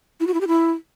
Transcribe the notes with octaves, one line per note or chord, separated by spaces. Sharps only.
E4
F#4
E4
G4
E4